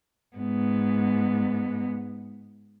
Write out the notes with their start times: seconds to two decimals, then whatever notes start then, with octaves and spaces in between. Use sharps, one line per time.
0.37 G#2 B3